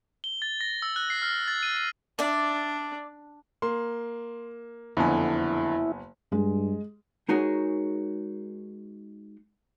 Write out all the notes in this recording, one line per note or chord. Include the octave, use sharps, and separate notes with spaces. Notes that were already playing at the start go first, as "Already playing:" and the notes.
G7
A6
A#6
E6
F#6
C7
F6
A6
D#7
D#7
D4 D5 E5
A#3 C6
F#1 F2 D3 B3 E4 G#5
G2 G#3
G#3 D#4 F#4 G#4 A#4 C#5